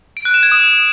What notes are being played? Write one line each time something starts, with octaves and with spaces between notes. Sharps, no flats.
D7
F#6
E7
G#6
D#6